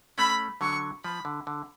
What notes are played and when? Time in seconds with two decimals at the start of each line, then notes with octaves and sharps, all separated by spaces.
0.18 A3 C#4 B5
0.61 D3 F#3 C#6
1.04 F3 B5
1.25 D3
1.47 D3